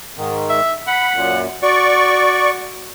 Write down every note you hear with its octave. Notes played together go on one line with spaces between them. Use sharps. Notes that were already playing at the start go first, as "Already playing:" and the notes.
G#2 D#3
E5
F#5 B5
F#2 A#2
F#4 D5 C#6